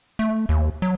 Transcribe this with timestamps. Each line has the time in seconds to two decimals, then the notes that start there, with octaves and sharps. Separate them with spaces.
0.19 A3
0.49 D#2
0.82 F#3